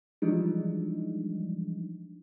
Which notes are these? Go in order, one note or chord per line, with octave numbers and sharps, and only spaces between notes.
E3 F3 G3 G#3 D4 D#4